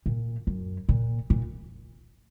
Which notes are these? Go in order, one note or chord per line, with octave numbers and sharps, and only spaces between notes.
A#2
F#2
A#2
A#2